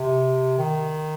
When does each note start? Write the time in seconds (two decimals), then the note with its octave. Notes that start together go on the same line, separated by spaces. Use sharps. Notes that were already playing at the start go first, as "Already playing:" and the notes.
Already playing: C3
0.58 D#3